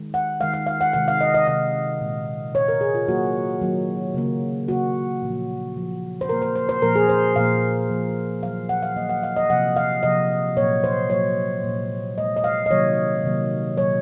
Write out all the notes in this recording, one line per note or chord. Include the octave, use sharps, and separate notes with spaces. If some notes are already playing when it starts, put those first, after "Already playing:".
Already playing: D#3 G#3
F#5
D#3 G#3 F5
F5
F5
F#5
C3 D#3 G#3 F#5
F5
D#5
D#5
C3 D#3 G#3 D#5
A#2 G#3
A#2 G#3 C#5
A#4
G#4
F4
D#3 F#3 A#3 F#4
D#3 F#3 A#3
C#3 F#3 A#3
C#3 F#3 A#3 F#4
A#2 F3 A#3
A#2 F3 A#3
C5
A#2 F3 A#3 A#4
C5
C5
C5
A#2 F3 A#3 A#4
G#4
C5
A#2 F3 A#3 F5
A#2 F3 A#3
D#3 F#3 A#3 F5
F#5
F5
D#3 F#3 A#3 D#5
F#5
F5
D#5
C3 F3 A#3 F#5
F5
C3 F3 A#3 D#5
A#2 F#3 A#3 C#5
C5
A#2 F#3 A#3 C#5
A#2 G#3
A#2 G#3 D#5
D#5
F5
D#5
C3 D#3 F#3 A#3 C#5
C3 D#3 F#3 A#3
A#2 F#3 A#3 C#5